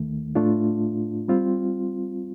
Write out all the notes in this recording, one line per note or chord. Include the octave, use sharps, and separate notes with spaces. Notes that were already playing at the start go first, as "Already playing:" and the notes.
Already playing: D#2 D#3 A3
A2 A3 D4 F4
G3 C4 F4